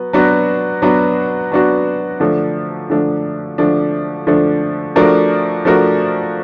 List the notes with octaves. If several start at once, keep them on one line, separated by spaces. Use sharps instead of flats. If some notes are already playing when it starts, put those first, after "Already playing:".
Already playing: F#3 B3
F#3 B3 D4 F#4
F#3 B3 D4 F#4
F#3 B3 D4 F#4
D3 F3 A3 D4
D3 F3 A3 D4
D3 F3 A3 D4
D3 F3 A3 D4
F3 A3 D4 F#4 A#4
F3 A3 D4 F#4 A#4